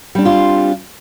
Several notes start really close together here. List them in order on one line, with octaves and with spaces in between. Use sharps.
G3 D4 C4 F4